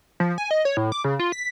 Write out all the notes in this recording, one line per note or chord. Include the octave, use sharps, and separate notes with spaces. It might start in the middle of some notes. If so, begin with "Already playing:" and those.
F3
G#5
D#5
C#5
A2
D6
C#3
F4
B6